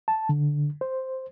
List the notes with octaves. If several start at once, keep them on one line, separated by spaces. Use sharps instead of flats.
A5
D3
C5